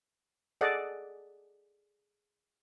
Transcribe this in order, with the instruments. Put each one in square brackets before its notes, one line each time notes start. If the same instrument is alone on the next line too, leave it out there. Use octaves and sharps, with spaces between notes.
[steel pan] G#4 A4 D5 D#5 F#5